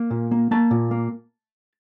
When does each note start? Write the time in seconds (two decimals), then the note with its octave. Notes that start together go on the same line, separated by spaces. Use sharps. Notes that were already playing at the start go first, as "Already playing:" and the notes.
Already playing: A#3
0.11 A#2
0.31 A#3
0.51 A#3 A5
0.71 A#2
0.91 A#3